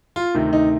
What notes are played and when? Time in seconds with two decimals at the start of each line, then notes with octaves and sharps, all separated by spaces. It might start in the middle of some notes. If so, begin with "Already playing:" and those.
0.16 F4
0.34 D2 C3 D#3
0.53 D#4